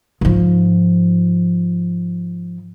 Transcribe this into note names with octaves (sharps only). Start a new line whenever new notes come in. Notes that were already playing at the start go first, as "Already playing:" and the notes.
G#2 F3